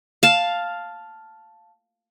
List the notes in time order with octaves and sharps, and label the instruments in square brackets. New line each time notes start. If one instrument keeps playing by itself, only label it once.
[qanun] F5 A5